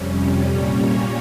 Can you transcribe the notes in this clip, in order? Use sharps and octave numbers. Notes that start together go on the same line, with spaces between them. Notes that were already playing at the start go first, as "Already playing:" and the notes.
Already playing: F2 C3 G3 C#4
A#2 G3 A#3 C#4 C#5